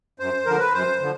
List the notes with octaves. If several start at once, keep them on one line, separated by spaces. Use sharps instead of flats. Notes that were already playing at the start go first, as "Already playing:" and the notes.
F#2 C5
D3 F3 A#4
B4
F#2 C5
D3 F3